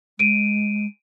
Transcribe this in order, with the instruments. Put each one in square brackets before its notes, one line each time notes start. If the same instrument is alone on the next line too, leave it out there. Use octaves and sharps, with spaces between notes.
[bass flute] G#3 [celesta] D7 D#7